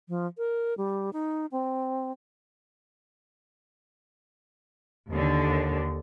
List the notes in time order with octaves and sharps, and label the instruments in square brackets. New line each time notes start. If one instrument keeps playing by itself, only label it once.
[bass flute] F3
A#4
G3
D#4
C4
[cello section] D#2 D3